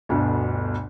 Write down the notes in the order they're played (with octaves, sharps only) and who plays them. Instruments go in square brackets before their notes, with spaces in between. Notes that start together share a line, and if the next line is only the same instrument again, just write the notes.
[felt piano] G1 D2 B2